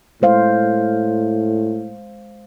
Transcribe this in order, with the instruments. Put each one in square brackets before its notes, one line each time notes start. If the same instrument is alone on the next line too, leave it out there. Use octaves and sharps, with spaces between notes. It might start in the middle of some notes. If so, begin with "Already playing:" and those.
[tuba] A2 [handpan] G#3 C5 F5